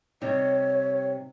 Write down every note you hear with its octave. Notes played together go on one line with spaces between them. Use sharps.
C3 G3 D#4 C#5